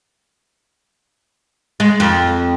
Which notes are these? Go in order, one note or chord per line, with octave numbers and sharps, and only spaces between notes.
G#3
F2